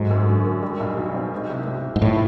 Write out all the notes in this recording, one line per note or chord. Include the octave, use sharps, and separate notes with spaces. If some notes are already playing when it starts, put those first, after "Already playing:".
Already playing: G#2 F#3 A3
F#2
D3
A#3
G3
B1
B2
C4
G#3
C2
B2
C2
G#2
A2 F3